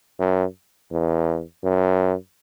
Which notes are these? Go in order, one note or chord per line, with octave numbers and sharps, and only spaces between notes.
F#2
E2
F#2